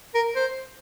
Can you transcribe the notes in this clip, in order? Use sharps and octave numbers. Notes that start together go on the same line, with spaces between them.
A#4
C5